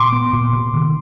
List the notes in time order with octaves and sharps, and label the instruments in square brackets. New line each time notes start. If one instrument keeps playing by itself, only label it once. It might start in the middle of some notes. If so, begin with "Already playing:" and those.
Already playing: [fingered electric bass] A#2 [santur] C6 D6
[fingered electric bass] B3
A#2
C3
D#3